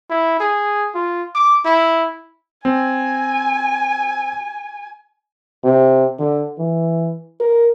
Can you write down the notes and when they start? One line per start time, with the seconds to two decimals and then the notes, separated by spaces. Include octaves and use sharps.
0.10 E4
0.40 G#4
0.95 F4
1.35 D6
1.65 E4
2.65 C4 G#5
5.64 C3
6.19 D3
6.58 E3
7.40 A#4